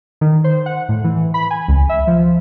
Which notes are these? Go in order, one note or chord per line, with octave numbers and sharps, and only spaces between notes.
D#3
C5
F#5
A2
E3
B5
G#5
C#2
E5
F3